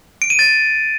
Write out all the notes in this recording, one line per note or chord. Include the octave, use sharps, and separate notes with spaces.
D7
D#7
A6